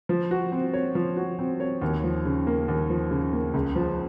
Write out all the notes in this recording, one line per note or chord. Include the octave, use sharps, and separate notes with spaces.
F3
F#4
C4
C#5
F3
F#4
C4
C#5
D#2
F3
C#3
A#3
D#2
F3
C#3
A#3
C#2
F3